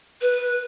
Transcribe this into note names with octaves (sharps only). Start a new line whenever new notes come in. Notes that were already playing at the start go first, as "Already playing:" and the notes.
B4